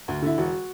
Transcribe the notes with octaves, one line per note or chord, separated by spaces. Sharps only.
D2
D3 E4
E1 F#4